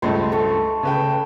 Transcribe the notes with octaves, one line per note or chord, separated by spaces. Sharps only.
C#2 G2 A3 C5
A4 C#6
C#3 B4 G5